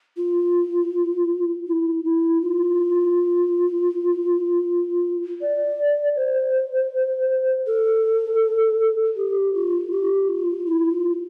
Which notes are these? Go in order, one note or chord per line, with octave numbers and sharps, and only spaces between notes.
F4
E4
E4
F4
D5
C5
A4
G4
F4
G4
F4
E4
F4